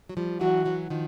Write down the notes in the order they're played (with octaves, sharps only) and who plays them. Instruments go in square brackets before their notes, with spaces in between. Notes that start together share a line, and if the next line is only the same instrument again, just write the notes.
[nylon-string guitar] F#3
F3 G3
[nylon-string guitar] E3 F#3 [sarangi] F#4
[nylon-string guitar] E3 F#3
D#3 F3